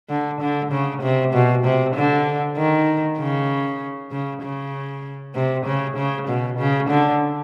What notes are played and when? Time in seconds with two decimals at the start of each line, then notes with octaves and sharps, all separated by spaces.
0.09 D3
0.41 D3
0.72 C#3
1.02 C3
1.33 B2
1.65 C3
1.95 D3
2.57 D#3
3.19 C#3
4.11 C#3
4.42 C#3
5.35 C3
5.66 C#3
5.97 C#3
6.28 B2
6.59 C#3
6.89 D3